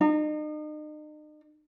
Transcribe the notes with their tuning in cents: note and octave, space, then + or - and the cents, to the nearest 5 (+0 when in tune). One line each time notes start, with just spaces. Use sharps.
D#4 -40